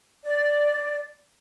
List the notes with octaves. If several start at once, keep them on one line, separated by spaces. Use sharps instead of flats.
D5